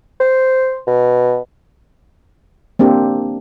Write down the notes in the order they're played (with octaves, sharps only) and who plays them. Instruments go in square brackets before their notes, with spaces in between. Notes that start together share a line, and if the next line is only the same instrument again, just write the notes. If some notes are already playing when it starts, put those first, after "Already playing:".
[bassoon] C5
B2
[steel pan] A#3 C4 D4 G4